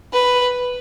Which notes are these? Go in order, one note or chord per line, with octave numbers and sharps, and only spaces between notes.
B4